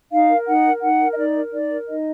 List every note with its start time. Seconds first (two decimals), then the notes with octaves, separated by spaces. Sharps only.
0.11 D#4 F5
0.29 A#4
0.47 D#4 F#5
0.65 A#4
0.82 D#4 F#5
1.00 A#4
1.12 D#5
1.17 D#4 D5
1.35 A#4
1.53 D#4 D5
1.71 A#4
1.88 D#4 D#5